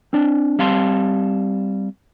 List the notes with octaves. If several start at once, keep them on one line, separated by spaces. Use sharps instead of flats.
C4 D4
G3 C4 F5 A5 C6